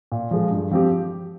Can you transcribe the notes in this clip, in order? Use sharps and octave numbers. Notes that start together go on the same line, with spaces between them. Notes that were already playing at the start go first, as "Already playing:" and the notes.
A#2
F3 G#3
G2
F3 C4 G4